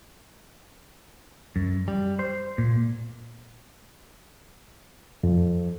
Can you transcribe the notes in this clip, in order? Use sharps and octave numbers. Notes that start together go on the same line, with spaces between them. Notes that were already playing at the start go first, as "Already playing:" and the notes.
F#2
G3
C5
A#2
F2